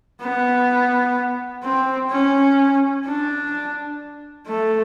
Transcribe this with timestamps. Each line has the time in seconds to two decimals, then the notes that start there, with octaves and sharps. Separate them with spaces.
0.21 B3
1.63 C4
2.11 C#4
3.05 D4
4.47 A3